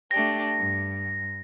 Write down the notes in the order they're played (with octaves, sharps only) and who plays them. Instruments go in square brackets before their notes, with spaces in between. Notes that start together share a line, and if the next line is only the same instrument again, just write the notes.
[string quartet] A3 D4 G4 [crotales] A#6
[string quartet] G2